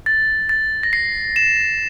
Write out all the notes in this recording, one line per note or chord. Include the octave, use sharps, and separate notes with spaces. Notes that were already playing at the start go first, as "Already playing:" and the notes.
A6
A6
A#6
C7
E7